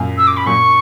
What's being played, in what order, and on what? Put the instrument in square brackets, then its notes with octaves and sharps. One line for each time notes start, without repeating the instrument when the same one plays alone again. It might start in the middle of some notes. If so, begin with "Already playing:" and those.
Already playing: [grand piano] F#2 A#2
[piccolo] E6
D6
B5
[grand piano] F#2 A#2 [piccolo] C#6